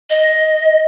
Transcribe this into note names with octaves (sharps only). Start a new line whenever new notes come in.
D#5